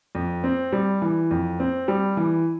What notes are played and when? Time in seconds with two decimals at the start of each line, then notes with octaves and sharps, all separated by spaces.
0.15 F2
0.44 C4
0.73 G3
1.02 E3
1.31 F2
1.60 C4
1.88 G3
2.17 E3